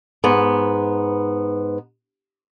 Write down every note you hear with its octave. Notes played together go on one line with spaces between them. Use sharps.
G#2 B3